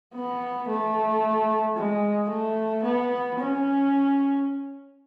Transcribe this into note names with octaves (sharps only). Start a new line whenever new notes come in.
B3
A3
G#3
A3
B3
C#4